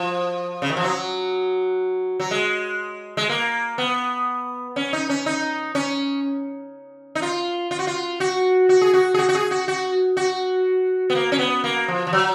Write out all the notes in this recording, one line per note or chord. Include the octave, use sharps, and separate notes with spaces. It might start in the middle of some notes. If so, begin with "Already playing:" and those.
Already playing: F3
C#3
D#3
F3
F#3
F#3
G#3
G#3
A#3
B3
C#4
D#4
C#4
D#4
C#4
D#4
F4
F4
F#4
F4
F#4
F#4
G#4
F#4
G#4
F#4
F#4
G#4
F#4
F#4
F#4
B3
A#3
C#4
B3
A#3
F3
F3
F#3